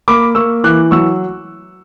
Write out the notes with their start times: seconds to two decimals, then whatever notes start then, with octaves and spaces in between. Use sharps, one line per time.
0.08 A#3 B5 D6
0.35 A#3 C#6 E6
0.64 E3 D6 F#6
0.91 F#3 C#6 E6